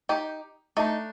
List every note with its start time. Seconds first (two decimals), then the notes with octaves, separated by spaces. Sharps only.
0.09 D#4 G4
0.77 A3 D4 D#4